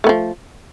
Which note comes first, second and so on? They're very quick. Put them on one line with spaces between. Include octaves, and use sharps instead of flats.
A3 B3 F3